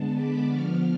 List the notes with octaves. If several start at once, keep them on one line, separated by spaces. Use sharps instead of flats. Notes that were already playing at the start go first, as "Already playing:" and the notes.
Already playing: D3 G#3 B3 A5
B5 D6
D3 F3 B3 C#6 F6